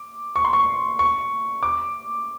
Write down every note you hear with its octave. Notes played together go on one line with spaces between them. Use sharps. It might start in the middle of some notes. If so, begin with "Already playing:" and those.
Already playing: D6
C#6
C6
C#6
C#6
D6